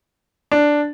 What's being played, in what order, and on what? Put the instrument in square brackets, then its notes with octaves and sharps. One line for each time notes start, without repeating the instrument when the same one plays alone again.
[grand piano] D4